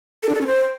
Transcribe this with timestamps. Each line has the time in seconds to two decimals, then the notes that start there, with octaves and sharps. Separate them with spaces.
0.23 A4
0.29 D4
0.35 A4
0.41 C#4
0.47 C5